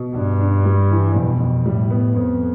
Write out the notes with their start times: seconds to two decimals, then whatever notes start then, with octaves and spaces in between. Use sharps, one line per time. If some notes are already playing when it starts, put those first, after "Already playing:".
Already playing: B2
0.15 G2 D4
0.41 D4
0.65 G3
0.91 E3
1.16 F2 B2
1.40 F2
1.66 A2 G3
1.91 B3
2.16 F2 B3